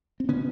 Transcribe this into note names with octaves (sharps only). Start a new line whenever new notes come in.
C4
D3 B3 C#4